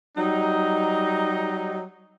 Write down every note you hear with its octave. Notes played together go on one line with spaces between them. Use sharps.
F#3 G3 D#4